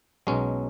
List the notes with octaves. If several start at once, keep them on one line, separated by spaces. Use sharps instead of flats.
B1 B2 F#3 G#3 C#4